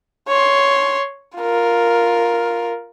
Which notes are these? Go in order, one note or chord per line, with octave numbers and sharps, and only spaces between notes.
C#5 C6
F4 A#4